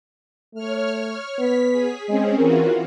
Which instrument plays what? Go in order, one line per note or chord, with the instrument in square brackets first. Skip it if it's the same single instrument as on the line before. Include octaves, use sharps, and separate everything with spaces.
[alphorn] A3 [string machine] C#5 F6
[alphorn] B3 [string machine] B6
[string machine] G#4
[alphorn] G#3 [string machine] C4 C#4 G#4
[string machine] E3 F4 F#4 [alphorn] A#4